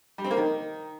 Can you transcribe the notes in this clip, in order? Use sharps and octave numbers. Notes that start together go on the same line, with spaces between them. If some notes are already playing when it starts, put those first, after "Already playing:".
G3
C4
A#3
D#3